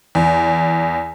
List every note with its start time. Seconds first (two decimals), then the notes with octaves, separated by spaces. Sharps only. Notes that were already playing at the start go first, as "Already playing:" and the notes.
0.15 E2